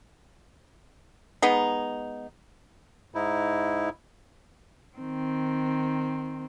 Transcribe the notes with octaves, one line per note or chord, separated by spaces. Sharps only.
G#3 B3 D#4
G#2 D#4 E4
D#3 C4